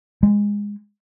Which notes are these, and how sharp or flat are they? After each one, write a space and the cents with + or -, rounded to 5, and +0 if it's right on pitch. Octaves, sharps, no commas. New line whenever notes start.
G#3 -15